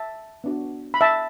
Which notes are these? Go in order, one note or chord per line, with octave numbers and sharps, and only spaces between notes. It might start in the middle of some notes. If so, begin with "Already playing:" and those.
Already playing: E5 A5
B3 D4 F#4
B5
E5 A5